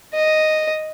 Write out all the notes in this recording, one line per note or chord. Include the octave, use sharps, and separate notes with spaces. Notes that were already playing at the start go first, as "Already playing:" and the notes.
D#5